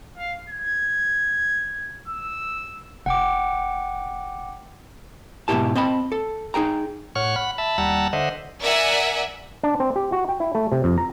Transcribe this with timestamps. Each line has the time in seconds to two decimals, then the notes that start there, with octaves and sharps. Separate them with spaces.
0.17 F5
0.50 G#6
2.08 E6
3.06 F1 F#5 G5 D6
5.48 G#2 B2 C#4 E4 G4 A5
5.75 C4 D#5 A5 B5
6.12 A4
6.54 D#4 G#4 G5 A#5
7.15 A2 C#5 F#5 C#6 F6
7.36 F#5 B5
7.58 E5 A5 B5
7.78 D#2 G3 F#5 A5 A#5 E6
8.13 D3 C5 D#5 E5 F#5
8.62 A#4 D5 E5 F#5 G#5
9.63 D4
9.80 C4
9.96 G4
10.12 F#4
10.29 G5
10.40 E4
10.55 A3
10.72 C3
10.84 F2
10.98 A#5